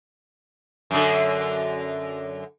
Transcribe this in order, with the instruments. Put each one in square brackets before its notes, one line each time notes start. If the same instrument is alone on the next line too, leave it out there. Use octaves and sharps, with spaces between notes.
[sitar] F#2 D3